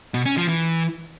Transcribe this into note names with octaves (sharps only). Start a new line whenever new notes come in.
B2
C#4
F3
E3